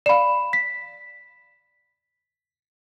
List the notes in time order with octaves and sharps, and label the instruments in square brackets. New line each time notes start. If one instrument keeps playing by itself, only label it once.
[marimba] D5 F5 [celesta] B5 E7
[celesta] B6